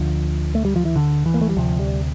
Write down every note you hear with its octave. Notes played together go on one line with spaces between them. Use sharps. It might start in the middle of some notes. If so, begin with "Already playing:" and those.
Already playing: D2 D3 F3
A3
G3
F3
E3
D3
E3
A#3
A3
G3
D2 C3 F3
G3